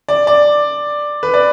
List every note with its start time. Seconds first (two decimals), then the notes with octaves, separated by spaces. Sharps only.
0.09 D5
0.27 D5
1.23 B4
1.34 D5